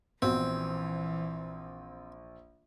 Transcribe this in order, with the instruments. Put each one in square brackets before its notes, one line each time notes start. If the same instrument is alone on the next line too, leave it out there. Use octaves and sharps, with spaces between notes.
[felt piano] A#1 [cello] E3 [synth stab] B3 F#4 [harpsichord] C4